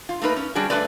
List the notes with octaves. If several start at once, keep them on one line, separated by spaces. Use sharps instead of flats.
F4
A3 A#3 D#4 B4
C#4
G3 C#4 D4 F#4 G#4
G2 A3 C4 B4 D5